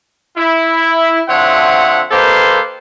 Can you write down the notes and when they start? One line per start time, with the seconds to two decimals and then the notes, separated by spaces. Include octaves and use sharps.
0.38 E4
1.29 D3 F3 C4 C#5 E5 F#5
2.11 D#3 A#3 G4 A4 B4 C5